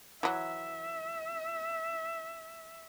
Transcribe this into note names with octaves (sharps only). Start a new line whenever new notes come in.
E3 F#3 E5